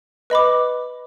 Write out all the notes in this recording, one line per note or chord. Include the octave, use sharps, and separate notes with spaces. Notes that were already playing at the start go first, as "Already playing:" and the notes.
B4 D#5 B5 D6